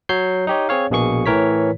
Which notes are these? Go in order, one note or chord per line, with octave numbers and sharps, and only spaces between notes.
F#3 C#5 G6 C7
D#4 G4 C#5
C4 G#4 C#5 F5
A#1 B2 A#3 G#4 C#6 C#7
A2 E3 A#4 C#5 B6